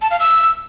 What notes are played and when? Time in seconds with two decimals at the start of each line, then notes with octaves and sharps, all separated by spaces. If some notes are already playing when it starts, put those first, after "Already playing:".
0.02 A5
0.11 F5
0.20 E6